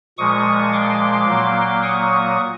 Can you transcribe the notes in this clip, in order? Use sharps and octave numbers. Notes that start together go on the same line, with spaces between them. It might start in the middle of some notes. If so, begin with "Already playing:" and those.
A#2 F3 G#3 C#6 D#6
C6 D6
A#2 F#3 A#3
C#6 D#6